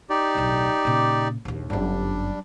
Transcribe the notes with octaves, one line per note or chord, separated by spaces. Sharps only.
D#4 G4 D5
D1 B1
A#2 C#3
A#1 D#2
G1 F#2 G3 D4